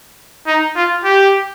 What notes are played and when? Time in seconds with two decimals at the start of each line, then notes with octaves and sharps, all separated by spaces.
0.47 D#4
0.76 F4
1.04 G4